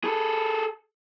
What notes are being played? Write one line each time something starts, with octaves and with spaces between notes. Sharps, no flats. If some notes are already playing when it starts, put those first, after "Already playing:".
G#4 A4